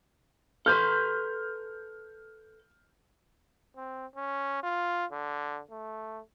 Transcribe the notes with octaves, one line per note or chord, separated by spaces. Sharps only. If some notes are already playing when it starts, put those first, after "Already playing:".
A4 B4 C6 F6 G6
C4
C#4
F4
D3
A3